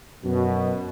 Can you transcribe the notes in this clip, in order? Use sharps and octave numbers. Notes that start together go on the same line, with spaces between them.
F#2 B2